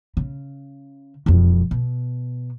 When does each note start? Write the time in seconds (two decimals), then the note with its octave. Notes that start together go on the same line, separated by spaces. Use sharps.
0.17 C#3
1.26 E1 F2
1.71 B2